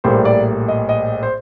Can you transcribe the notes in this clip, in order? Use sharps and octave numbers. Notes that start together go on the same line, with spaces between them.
A#1 A2 G3 A#3 C5
D5
D#5
D#5
C5